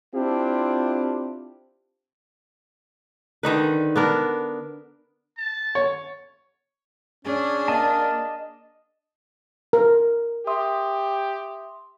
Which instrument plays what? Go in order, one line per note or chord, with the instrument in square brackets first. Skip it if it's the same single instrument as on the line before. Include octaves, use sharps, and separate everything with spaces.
[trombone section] C4 D4 E4 F4 G4
[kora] D3 D#3 D#4 B4
B3 D4 A#4
[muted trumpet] A5
[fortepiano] C#5
[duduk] C#4 [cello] D4 [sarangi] G#4
[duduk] A#3 [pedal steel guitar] D#5 A5
[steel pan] A#4
[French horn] G4 [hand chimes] E5 C6 D#6